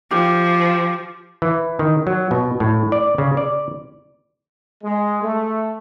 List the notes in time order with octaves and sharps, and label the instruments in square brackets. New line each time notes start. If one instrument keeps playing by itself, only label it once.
[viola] F3 [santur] G4
[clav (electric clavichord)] E3
D#3
F#3
B2
A2
D5
C#3
D5
[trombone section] G#3
A3